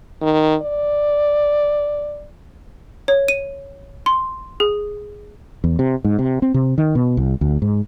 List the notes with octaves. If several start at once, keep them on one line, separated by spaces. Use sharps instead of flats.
D#3
D5
C#5
D#7
C6
G#4
E2
C3
G#2
C3
C4
C3
D#3
B2
C2
D2
G#2